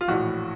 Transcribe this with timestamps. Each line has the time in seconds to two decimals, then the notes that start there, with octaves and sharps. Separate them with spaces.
0.01 F4
0.08 A#1 A2 E3 F#4